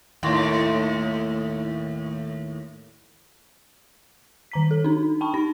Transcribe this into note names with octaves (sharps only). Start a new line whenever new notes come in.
D#2 A2
D#3 A#5 B6
A4
D4 D#4
G5 A5 B5 C#6
D#4 A#6